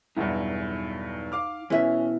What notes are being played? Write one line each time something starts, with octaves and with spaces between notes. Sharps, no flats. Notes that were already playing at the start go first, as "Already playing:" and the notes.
B1 E2 G2 D#4 E5 F#5
F5 D6 F6
B2 E3 C#4 B4 E5